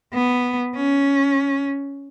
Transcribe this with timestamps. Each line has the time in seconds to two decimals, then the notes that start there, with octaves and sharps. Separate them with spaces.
0.14 B3
0.75 C#4